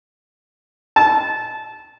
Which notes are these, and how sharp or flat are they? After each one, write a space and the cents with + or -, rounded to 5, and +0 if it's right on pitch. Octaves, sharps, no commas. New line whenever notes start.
A5 -20